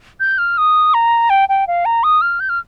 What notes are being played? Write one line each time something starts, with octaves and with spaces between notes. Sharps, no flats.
G6
F6
D#6
A#5
G5
G5
F5
A#5
D#6
F6
G6
F6